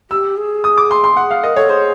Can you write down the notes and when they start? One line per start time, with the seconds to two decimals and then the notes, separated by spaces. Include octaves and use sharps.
0.11 G4 E6
0.37 G#4
0.64 D#6
0.77 D6
0.91 C6
1.04 C6
1.17 F#5
1.31 F5
1.43 A#4 D#5
1.56 A4 C#5
1.69 G#4 C5